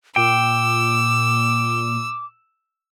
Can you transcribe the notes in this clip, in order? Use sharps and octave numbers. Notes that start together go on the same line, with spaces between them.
A#2 G5 D6 E6